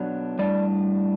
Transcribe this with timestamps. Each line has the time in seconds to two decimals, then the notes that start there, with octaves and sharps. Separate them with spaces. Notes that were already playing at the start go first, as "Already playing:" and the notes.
Already playing: B2 F#3 B3 D4
0.39 A2 G3 D4 D5